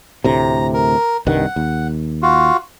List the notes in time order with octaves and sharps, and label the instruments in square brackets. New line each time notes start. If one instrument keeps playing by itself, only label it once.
[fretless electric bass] D2 A2 C3 [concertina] A#5
[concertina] A#4
[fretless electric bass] C2 G2 D#3 [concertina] F#5
[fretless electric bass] D#2
[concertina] F4 F#4